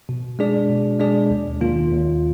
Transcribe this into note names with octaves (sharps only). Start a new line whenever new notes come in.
B2
G#3 D4 G#4 D5
B2
G#3 D4 G#4 D5
D#2
D#3 A#3 F4
D#2